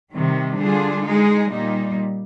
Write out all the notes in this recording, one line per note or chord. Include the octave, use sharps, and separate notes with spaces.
C3 D#3 G3
D3 G3 D4 F4 G#4
G#3 D#4 G#4
A#2 G3 A#3 D#4